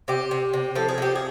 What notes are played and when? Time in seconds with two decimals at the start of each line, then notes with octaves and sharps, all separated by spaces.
0.08 C3 G4
0.31 C3
0.53 C3
0.75 F3 A4
0.88 G#4
0.98 C3 G4
1.15 G#4